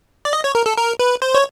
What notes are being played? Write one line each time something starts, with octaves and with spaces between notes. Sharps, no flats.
D5
D#5
C#5
A#4
A4
A#4
B4
C5
C#5